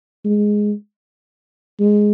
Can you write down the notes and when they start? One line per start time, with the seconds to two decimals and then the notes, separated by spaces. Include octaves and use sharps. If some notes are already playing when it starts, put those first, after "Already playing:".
0.25 G#3
1.80 G#3